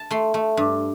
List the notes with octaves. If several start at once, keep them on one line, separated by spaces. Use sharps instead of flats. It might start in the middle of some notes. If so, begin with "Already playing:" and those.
Already playing: A5
A3 C6
A3
G2